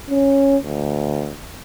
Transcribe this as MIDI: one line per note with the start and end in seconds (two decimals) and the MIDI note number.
0.10 0.57 61
0.63 1.36 38